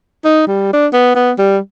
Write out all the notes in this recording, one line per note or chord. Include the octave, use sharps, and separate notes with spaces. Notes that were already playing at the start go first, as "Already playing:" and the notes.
D#4
G3
D4
B3
B3
G3